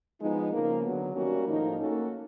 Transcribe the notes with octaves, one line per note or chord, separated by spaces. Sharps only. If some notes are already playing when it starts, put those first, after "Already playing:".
F3 G#3 B3 D#4
C#3 F3 A#3
D3 F#3 B3
D#3 G3 A#3 C#4 F#4
A2 F3 A#3 D#4
A#3 C#4 F#4 A4